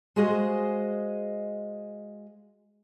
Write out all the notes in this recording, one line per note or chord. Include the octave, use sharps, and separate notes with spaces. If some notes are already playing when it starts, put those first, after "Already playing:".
G#3 F#4 G#4 C5 D#5 F5